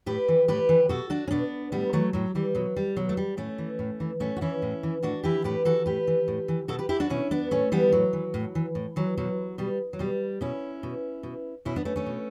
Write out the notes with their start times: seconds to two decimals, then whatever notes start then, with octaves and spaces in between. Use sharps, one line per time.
0.06 A2 G4 B4
0.28 E3
0.48 A2 G4 B4
0.69 E3
0.89 B2 F#4 A4
1.10 D4 F#4
1.28 C#4
1.31 B2 B3 D4
1.72 A2 G3 B3
1.93 E3 F#3 A3
2.13 A2 F#3
2.35 E3 G3
2.55 B2 F#3
2.76 G3
2.97 B2 F#3
3.09 A3
3.17 G3
3.37 A2 A3 C#4
3.58 E3
3.79 A2
4.00 E3
4.20 A2 A3 C#4
4.36 F#4
4.41 E3 C#4 E4
4.62 A2
4.83 E3
5.03 A2 D4 F#4
5.23 E3 E4 G4
5.44 A2 G4 B4
5.65 E3 F#4 A4
5.86 A2 G4 B4
6.07 E3
6.28 A2
6.48 E3
6.68 B2 F#4 A4
6.79 G4 B4
6.89 E4 G4
7.00 D4 F#4
7.10 B2 C#4 E4
7.31 B3 D4
7.51 A2 A3 C#4
7.72 E3 G3 B3
7.92 A2 F#3
8.13 E3
8.34 A2
8.55 E3
8.75 A2
8.96 E3 F#3
9.18 B2 F#3
9.58 B2 G3
9.93 F#3
9.99 B2 G3
10.41 B2 C#4 E4
10.83 B2
11.23 B2
11.65 B2 C#4 E4
11.76 B3 D4
11.85 A3 C#4
11.96 A3 C#4
12.06 B2